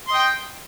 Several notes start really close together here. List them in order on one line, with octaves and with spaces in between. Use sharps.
C6 D#5 G5